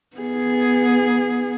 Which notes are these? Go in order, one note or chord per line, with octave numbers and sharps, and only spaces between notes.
B3 G#4